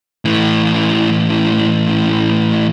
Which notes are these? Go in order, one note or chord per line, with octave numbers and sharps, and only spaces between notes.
A2 E3